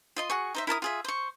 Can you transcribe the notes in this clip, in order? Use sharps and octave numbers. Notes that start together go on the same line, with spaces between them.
F4 D#5 C6
F#4 G#4 C#6
D#4 C5 E5
E4 A#4 A5 D#6
F4 G#4 E5
C5 C#6